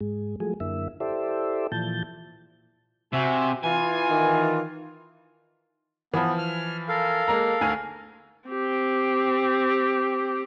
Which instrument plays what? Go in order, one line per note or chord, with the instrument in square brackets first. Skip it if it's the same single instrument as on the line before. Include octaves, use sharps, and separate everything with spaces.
[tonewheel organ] G#2 G#3
F3 F#3 G#3 A3 G#4
F#2 D3 A#3 E4 E5
E4 G4 A4 C5 D5 E5
A#2 E3 F3 A5 G6
[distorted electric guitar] C3 [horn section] F#4 E5 G#5
[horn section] E3 F4 [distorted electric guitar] G#5
[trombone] D#3
[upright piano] E3 F3 [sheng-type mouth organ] B3
[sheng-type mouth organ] F6
A4 A#4 F5
[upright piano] G#3 A#3 A#5
D2 G#5 F6
[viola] C4 G4